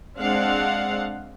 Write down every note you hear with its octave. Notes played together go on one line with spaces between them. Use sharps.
G#3 C4 D4 F5 F#5